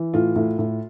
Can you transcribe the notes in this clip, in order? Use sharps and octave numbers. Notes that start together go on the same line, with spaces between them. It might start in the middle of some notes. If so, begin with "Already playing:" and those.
Already playing: E3
A2 F4
A2
A2